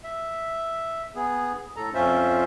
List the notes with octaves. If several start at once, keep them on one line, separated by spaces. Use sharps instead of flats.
E5
B3 G#4
A2 A4 A#5
F2 C#4 F4 C5 E5